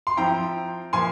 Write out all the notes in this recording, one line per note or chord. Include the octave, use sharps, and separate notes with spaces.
C6
F3 C4 E4 G5 A#5
A#2 F3 A#3 G#5 C6